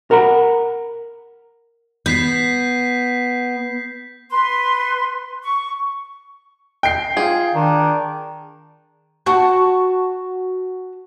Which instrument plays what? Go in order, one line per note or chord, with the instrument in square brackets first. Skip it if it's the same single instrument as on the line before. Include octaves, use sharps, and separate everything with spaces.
[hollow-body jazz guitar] A#4 F#5 A#5 B5
[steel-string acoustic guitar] B3 [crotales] G6 B6 C7
[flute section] B4 C6
C#6
[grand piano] G5 C7
[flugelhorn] F4 [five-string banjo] G#4
[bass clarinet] D#3 [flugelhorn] D4
[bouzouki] F#4 A5